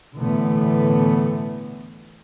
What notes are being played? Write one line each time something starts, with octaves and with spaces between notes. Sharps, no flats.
A2 D3 E3 A3 B3